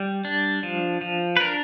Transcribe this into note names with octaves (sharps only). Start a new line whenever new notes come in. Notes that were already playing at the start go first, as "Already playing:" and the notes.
Already playing: G3
D4
F3
F3
B4
D4 A#4